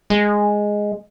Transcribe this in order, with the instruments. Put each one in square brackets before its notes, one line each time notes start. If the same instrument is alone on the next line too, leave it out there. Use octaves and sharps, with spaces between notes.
[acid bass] G#3